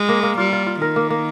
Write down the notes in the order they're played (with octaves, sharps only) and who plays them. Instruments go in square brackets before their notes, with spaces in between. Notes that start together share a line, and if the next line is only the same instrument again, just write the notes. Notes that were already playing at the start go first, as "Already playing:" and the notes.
Already playing: [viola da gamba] G#3 [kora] F4
[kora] A#3
A#3
[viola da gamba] G3 [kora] F4
[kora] F4
F4
[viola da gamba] D#3 [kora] A#4
[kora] A#3
A#3